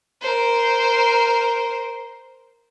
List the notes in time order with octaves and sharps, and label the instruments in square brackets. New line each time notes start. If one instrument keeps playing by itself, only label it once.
[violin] A#4 C5